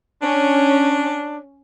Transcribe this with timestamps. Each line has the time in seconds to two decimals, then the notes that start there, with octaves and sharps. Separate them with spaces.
0.22 C#4 D4